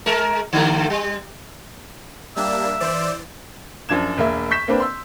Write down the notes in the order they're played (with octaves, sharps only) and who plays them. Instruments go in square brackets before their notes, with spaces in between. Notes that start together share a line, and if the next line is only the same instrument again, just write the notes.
[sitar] G#3 A#4
D3 G3 A3
G3
[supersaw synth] G3 A#3 D4 [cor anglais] E5
[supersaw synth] E3 C5 D5
[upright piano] F#2 F3 D4 G#6 E7
E1 A#3 E5
C#6 G6 B6 E7
A#3 C4 D4 B4
C6 E6